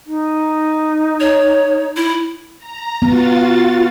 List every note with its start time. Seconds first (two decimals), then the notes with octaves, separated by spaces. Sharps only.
0.07 D#4
1.20 C#5
1.96 E4
2.58 A#5
3.02 B3 F4 F#4 A6